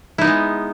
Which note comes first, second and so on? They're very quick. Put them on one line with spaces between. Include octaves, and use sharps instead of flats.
E4 D#4 B3 G#3